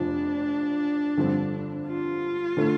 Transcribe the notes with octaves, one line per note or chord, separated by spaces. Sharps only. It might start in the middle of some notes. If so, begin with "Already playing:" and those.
Already playing: F1 F2 F3 D4
G2 D3 F3 C4 A4
F4
D3 A3